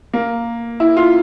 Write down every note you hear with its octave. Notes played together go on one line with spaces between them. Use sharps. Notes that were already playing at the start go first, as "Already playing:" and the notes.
A#3
E4
F4